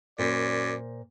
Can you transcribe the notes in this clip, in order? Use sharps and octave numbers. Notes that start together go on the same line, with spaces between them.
F#2 A#2 C5 D5